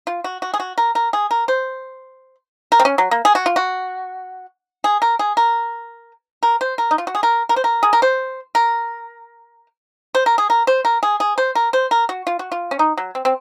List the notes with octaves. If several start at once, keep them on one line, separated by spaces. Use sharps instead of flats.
F4
F#4
F#4
G#4
F#4
A#4
A#4
G#4
A#4
C5
A#4
C4
C#4
F#3
A#3
G#4
F#4
F4
F#4
G#4
A#4
G#4
A#4
A#4
C5
A#4
D#4
F4
F#4
G#4
A#4
A#4
C5
A#4
G#4
A#4
C5
A#4
C5
A#4
G#4
A#4
C5
A#4
G#4
G#4
C5
A#4
C5
A#4
F#4
F4
F#4
F4
C#4
D#4
F#3
C4
C4